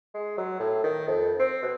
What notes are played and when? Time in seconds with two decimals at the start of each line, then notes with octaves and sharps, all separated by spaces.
0.14 G#3
0.37 F#3
0.60 A2
0.84 D#3
1.07 F2
1.39 C4
1.63 B2